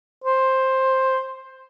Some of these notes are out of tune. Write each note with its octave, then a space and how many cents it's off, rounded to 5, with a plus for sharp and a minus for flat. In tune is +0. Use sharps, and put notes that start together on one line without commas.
C5 +10